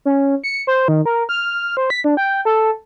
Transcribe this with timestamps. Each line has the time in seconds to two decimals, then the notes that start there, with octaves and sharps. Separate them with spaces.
0.05 C#4
0.44 C#7
0.67 C5
0.88 D#3
1.06 A#4
1.29 F6
1.77 C5
1.90 B6
2.04 D4
2.17 G5
2.45 A4